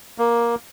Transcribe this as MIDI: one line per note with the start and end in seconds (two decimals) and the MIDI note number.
0.18 0.55 58